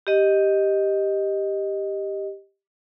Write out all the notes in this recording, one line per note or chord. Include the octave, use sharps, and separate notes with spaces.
G4 D#5